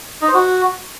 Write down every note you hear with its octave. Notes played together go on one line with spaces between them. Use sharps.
D#4
C5
F#4